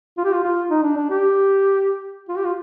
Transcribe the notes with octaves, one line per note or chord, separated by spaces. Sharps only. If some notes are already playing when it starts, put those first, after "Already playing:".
F4
G4
F4
F4
D#4
D4
D4
G4
F4
G4
F4